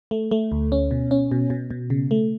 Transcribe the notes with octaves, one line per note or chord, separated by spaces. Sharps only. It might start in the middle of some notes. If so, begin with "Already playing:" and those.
A3
A3
D2
C#4
B2
C#4
B2
B2
B2
C#3
A3